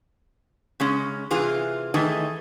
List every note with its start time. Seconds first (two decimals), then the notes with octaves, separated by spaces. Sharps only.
0.80 C#3 G#3 C#4
1.31 C3 E3 F4 G#4
1.94 D#3 E3 A3 G#4 D#5